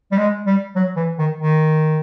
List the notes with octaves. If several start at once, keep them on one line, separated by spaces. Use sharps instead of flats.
G3
G#3
G3
F#3
E3
D#3
D#3